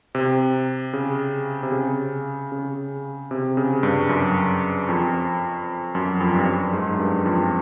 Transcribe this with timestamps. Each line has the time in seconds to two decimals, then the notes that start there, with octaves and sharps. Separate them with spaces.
0.15 C3
0.93 C#3
1.63 C3
1.72 C#3
2.52 C#3
3.31 C3
3.57 C#3
3.83 G2
4.09 F#2
4.89 F2
5.95 F#2
6.21 F2
6.35 G2
6.47 F#2
6.73 G#2
6.95 F#2
6.99 G2
7.26 F2